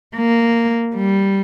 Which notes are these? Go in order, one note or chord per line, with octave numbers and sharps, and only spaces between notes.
A#3
G3